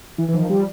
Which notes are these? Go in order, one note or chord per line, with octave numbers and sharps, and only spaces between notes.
E3
E3
D#3 F3
F3 G3